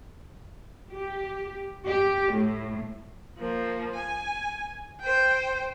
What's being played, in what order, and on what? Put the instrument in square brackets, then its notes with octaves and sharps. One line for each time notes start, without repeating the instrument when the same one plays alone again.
[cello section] G4
G4
A2
[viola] F3 A#3
G#5
C5 G5